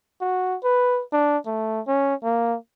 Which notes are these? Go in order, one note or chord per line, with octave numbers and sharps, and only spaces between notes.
F#4
B4
D4
A3
C#4
A#3